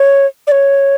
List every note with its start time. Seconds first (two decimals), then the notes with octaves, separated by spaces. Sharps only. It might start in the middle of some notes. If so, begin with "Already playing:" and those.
Already playing: C#5
0.47 D5
0.52 C#5